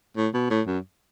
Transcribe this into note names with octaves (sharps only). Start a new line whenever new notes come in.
A2
B2
A2
F#2